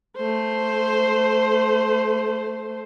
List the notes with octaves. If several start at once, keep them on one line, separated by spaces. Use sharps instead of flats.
A3 C5